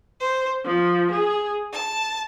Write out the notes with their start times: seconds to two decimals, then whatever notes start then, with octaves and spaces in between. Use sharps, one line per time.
0.20 C5
0.65 F3
1.11 G#4
1.72 A5